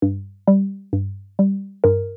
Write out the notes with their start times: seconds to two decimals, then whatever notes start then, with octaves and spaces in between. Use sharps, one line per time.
0.02 G2
0.48 G3
0.93 G2
1.39 G3
1.84 G2 A#4